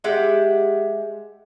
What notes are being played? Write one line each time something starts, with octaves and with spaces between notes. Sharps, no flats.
G#3 G4 E5 F#5